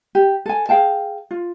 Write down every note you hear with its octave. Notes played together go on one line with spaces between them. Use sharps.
G4
A4 G#5
G#4 F5 G5 A5
F4